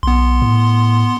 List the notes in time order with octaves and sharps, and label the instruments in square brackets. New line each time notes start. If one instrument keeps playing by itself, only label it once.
[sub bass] B1 [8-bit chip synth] B3 C6
[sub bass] A2